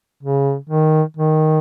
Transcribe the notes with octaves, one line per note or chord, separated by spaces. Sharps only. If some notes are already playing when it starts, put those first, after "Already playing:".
C#3
D#3
D#3